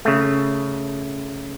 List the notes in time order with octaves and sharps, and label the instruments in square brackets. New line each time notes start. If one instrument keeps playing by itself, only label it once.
[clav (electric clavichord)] C#3 A3